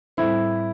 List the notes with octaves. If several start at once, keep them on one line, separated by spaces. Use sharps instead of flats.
A2 G3 C4 E4 A4 C5